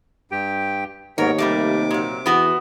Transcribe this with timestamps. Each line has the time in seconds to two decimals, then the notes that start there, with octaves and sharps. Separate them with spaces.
0.31 G2 G4 G5
1.18 D#2 G#2 B3 A#4 C#5
1.38 C3 G3 A3 A#3 D6
1.91 A#2 F#3
2.26 E2 B3 F#4